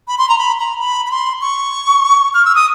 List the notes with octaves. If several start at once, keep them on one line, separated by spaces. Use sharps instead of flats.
B5
C6
A#5
B5
A#5
B5
B5
C6
C#6
F6
E6
D#6